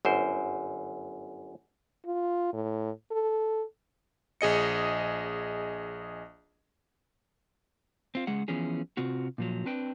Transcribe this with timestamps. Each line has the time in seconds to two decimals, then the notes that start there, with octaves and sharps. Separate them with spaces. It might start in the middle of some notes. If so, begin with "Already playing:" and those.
0.05 G1 F#2 C5
2.06 F4
2.53 A2
3.11 A4
4.41 A#1 G#4 D#5 C#7
8.15 C4 F4
8.27 C#3 G#3 G#4 F#5
8.48 E3 F3 B3 C#4 G#4
8.97 C3 C4 F4 F#4
9.38 A#2 F3 F#3
9.66 C4 D4 B4 G5